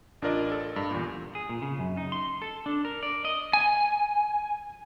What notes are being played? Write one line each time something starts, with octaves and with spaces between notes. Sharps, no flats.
A1 D4 F4 A#4 D5 D#5
A4
G2
E2 A#2
G#4
A#2
C#3
F#2
D#4
C6
A4
D4
A#4
D5
D#5
G#5